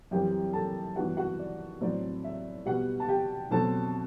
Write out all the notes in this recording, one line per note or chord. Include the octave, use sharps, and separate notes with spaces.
F#2 E3 G3 C4 G4 G5
A4 A5
G2 E3 B3 F#4 F#5
F#4 F#5
D5
A2 F#3 A3 C4 D5
E5
B2 G3 B3 F#4 F#5
A5
G4 G5
B2 F#3 A3 C4 A4 A5